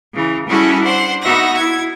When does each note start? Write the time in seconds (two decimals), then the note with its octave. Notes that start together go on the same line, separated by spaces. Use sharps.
0.14 C#3 E3
0.48 G3 C#4 E4 F#4 G#4 A4
0.83 D4 C5 F#5
1.22 B3 D#4 F#4 E5 F#5 A#6
1.57 E4 G#6